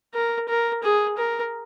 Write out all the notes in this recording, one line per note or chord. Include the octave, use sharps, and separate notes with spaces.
A#4
A#4
G#4
A#4